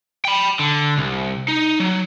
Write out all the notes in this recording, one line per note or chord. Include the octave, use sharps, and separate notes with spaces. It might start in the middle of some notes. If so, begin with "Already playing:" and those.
G5 B5
D3
C2
D#4
F#3